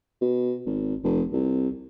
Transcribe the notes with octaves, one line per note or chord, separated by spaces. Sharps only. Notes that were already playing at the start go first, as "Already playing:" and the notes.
B2
G#1
F1
C2